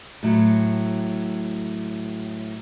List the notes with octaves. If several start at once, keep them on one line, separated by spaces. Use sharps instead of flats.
A2 F#3